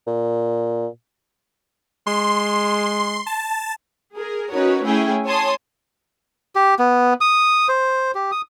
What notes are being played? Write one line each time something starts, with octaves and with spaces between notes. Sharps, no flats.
A#2
G#3 C6
A5
G#4 A#4
C#4 D#4 F#4 A#4 B4 C#5
A3 C#4 E4 G#4 G5 G#5
C#5 G#5 A5 C6 D#6
G4
B3
D#6
C5
G4
D#6